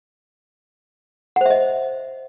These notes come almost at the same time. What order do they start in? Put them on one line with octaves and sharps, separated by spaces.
F#5 C5 E5 D#5